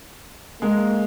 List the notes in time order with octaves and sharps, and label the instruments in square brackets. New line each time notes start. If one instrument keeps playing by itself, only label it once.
[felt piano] G#3 [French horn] A#3